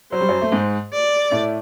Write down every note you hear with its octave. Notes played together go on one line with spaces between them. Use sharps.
F#3 C5
G3
F#2 F#3
A3
G#2 G#3
D5
A2 A3